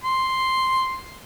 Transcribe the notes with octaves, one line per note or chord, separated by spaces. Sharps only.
C6